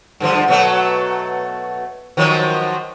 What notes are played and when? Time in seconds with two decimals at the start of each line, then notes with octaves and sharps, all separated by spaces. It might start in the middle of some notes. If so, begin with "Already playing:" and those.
0.20 G2 D3 F3
0.48 B2 F#3 A3
2.17 D#3 F3 F#3